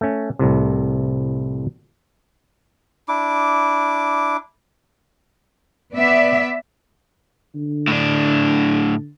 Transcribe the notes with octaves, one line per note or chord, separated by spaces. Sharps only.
A3 C#4
C2 A2 C3
D4 E4 D6
B3 D5 E5
D3
A2 D4